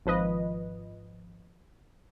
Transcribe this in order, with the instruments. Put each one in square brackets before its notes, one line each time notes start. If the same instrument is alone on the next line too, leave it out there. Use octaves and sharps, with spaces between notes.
[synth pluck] G#1 F3 B4 D#5